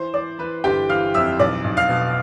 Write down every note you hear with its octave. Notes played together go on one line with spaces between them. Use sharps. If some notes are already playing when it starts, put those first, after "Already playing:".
Already playing: E3 C5 C6
E3 D5 D6
E3 B4 B5
G1 G4 G5
E3 F5 F6
F2 E5 E6
B1 D5 D6
B1
F5 F6
B2